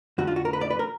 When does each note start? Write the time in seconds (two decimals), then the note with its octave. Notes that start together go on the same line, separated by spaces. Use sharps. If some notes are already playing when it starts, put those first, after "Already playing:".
0.18 F2 D3 F#4
0.27 F4
0.36 F#4
0.45 A#4
0.53 B4
0.61 D5
0.70 B4
0.79 A#4